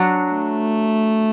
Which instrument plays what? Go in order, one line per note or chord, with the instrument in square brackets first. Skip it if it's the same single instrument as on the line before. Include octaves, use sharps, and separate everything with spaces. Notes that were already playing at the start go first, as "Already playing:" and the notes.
Already playing: [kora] F#3 D4 F#4
[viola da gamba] A3